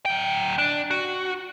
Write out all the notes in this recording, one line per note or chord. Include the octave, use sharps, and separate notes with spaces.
F#3 G5
D4
F#4